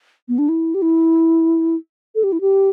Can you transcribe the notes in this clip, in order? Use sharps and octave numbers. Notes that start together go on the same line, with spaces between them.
B3
D4
E4
G4
E4
A4
G4
E4
G4